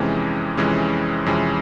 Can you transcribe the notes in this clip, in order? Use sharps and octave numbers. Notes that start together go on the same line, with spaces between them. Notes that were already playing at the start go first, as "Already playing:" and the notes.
Already playing: F2 C3 E3 G#3 C#4
F2 C3 E3 G#3 C#4
F2 C3 E3 G#3 C#4